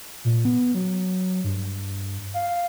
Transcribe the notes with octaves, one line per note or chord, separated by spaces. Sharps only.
A#2
B3
F#3
G2
F5